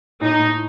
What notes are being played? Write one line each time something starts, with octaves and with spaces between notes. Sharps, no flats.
A2 D#4
A2